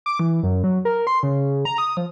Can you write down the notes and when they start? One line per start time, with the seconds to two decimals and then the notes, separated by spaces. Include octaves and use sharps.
0.06 D6
0.20 E3
0.43 F#2
0.64 F#3
0.85 A#4
1.07 C6
1.23 C#3
1.65 A#5
1.78 D#6
1.97 F3